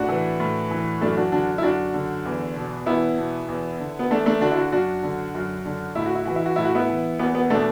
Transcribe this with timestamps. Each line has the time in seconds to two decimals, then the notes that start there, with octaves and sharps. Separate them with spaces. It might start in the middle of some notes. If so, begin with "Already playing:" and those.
Already playing: A2 D4 F#4
0.08 E3
0.40 A2
0.71 E3
1.01 F#2 A3 D4
1.17 D4 F#4
1.32 D3 D4 F#4
1.58 E4
1.63 F#2 D4 F#4
1.94 D3
2.25 E2
2.56 B2
2.86 E2 B3 E4
3.18 B2
3.48 E2
3.80 D3
3.99 B3
4.11 E2 A3 D4
4.26 A3 D4
4.41 D3 D4 F#4
4.51 E4
4.56 D4 F#4
4.72 F#2 D4 F#4
5.03 D3
5.34 F#2
5.65 D3
5.95 A2 E4
6.06 F#4
6.15 E4
6.25 E3 F#4
6.36 E4
6.46 F#4
6.56 A2 E4
6.65 F#4
6.75 B3 E4
6.89 E3
7.19 E2 B3
7.35 B3
7.50 B2 A3 D4